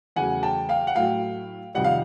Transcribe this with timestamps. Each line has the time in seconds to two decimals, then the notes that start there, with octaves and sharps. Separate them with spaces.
0.16 E2 C#3 F#3 A3 F#5 G#5
0.43 G5 A5
0.69 F5 G5
0.87 F#5
0.95 A2 F#3 A3 F5 G5
1.75 F2 C3 D#3 G3 F#5
1.84 F5